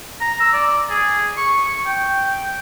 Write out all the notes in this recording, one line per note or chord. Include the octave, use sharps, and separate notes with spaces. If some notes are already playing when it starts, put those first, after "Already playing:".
A#5
E6
D5
G#4
C#6
G5